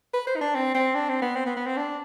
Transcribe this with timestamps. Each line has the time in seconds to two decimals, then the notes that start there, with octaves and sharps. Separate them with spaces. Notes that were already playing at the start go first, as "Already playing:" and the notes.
0.13 B4
0.27 C5
0.36 D#4
0.41 D4
0.55 C4
0.74 C4
0.95 D4
1.09 C4
1.22 B3
1.35 C4
1.46 B3
1.56 B3
1.66 C4
1.77 D4